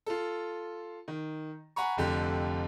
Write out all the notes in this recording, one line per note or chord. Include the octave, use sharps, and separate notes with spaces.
F4 A4
D#3
F#5 G#5 A#5 B5 C#6
F1 F2 D3 G4